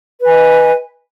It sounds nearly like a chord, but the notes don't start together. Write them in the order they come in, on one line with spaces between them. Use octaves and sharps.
B4 G#5 D#5